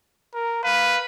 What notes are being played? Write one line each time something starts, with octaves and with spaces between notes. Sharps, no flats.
A#4
B4 F5